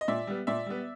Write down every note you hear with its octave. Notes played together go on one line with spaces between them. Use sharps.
D#5
A#2 D5 E5
G3 B3
A#2 D5 E5
G3 B3